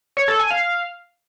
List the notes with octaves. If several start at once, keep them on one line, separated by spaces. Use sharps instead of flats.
C#5
A4
G#5
F5